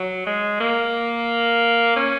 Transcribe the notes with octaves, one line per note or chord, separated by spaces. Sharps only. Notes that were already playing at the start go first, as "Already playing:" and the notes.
Already playing: F#3
G#3
A#3
C#4